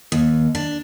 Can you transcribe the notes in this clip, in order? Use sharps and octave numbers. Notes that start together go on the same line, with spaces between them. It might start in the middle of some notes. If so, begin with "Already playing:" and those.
D#2
D4